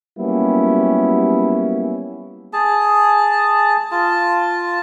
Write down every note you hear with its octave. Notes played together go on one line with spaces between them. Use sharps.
F#3 G3 A#3 B3 C#4 E4
G#4 A5
F4 A5